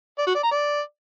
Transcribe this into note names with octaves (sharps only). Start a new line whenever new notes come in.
D5
F#4
D5
A#5
D5